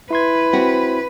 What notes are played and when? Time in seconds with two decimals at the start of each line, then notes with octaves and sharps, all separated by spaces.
0.11 E4 B4 C6 G#6
0.53 C4 F#4